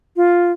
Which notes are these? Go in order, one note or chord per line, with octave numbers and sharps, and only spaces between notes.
F4